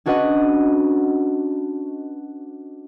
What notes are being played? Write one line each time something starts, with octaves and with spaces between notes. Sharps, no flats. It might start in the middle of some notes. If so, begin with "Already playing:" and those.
C#4 D4 F#4 B4 D#5 F#5